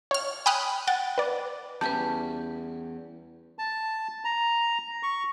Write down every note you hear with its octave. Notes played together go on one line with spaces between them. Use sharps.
C#5 F6
G5 G#5 B5 D#6 F6 F#6
F#5 G5 A6
B4 D5
E2 G3 C#4 B4 E5 A5 G6
A5
A#5
C#6